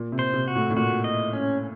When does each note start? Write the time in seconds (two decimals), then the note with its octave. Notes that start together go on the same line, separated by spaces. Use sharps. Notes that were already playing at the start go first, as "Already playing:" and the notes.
Already playing: A#2
0.12 C3
0.19 C5
0.34 C3
0.48 F#4
0.55 A2
0.70 A2
0.76 A#2 F#4
1.04 D#5
1.33 C#4